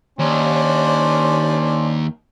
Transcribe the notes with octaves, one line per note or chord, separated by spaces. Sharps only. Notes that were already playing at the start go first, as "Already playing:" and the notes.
D#2 C#4 D4 C5